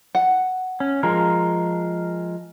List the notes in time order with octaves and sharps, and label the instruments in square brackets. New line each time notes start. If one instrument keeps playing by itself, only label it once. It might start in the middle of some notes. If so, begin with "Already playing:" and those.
[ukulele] F#5
[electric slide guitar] C#4
F3 G#3 A#4